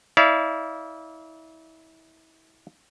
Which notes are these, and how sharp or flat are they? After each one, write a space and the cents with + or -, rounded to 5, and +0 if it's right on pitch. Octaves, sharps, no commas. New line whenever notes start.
E4 -35 D5 -35 F5 -25